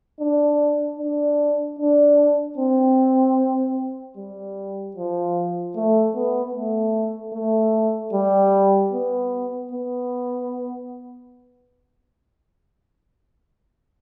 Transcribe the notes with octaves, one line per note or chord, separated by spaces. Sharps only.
D4
D4
D4
C4
G3
F3
A3
B3
A3
A3
G3
B3
B3